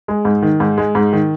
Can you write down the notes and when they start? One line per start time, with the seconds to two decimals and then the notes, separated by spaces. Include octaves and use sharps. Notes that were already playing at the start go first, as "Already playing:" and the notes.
0.08 G#3
0.25 G#2
0.42 D#3
0.60 G#2
0.78 G#3
0.95 G#2
1.13 D#3